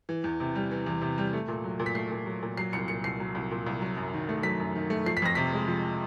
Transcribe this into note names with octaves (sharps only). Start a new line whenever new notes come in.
E3
E2
C3
G3
E3
E2
C3
G3
A3
A#2
F#3
A#2
B6
A3 C7
A#2
F#3
A#2
F#3 C7
C2 C#7
A#2 C#7
C2 C7
F#3
C2
A#2
C2
F#3
F#2
D#3
A3
F#3 B6
F#2
D#3
A3
F3 C7
B6
F2 A#6
C3 B6
G#3
F3